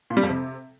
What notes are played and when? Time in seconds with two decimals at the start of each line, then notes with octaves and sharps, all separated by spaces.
0.10 A#2
0.17 G3
0.23 F2
0.29 C3